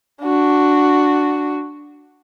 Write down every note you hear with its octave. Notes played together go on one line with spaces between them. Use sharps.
D4 F#4